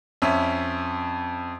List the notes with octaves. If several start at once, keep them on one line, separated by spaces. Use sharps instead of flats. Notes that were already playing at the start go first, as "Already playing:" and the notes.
F2 C#4 E5